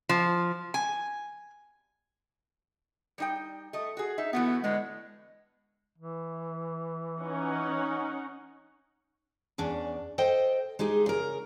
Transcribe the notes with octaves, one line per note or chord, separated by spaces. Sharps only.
F3
G#5
G3 D#4 G5
A3 D#5
F#4 G#4
D#4 E5
E3 A3 B3 F#4
A2 D3 G#3 B3
E3
C#4 D#4 F#5
E2 C#4 D4
A4 C5 D#5 G5
G#3 D#4 G4 G#4
C#3 A#4